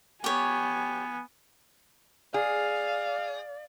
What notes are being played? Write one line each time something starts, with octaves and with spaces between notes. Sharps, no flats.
B3 G4 C#5 G#5
G#4 D5 F5